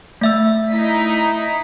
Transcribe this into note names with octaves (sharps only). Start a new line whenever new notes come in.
A3 E5 E6
D#4 E4 B6